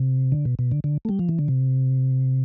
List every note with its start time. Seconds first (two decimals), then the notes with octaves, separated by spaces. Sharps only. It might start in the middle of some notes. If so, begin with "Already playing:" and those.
Already playing: C3
0.32 D3
0.45 B2
0.59 B2
0.71 D3
0.84 D3
1.05 A3
1.09 G3
1.19 F3
1.29 E3
1.39 D3
1.48 C3